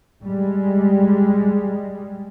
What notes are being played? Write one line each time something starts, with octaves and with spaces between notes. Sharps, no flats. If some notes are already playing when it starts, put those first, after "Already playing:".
G3 G#3